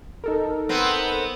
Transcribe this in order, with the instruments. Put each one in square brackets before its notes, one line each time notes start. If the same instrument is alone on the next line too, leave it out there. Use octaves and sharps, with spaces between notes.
[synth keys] D#4 A4 A#4
[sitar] B3 C4